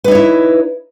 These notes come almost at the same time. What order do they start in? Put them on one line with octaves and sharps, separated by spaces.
B4 D#4 C#5 E4